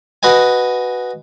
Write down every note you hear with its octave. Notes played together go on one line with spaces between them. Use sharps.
F#4 B4 D#5 G#5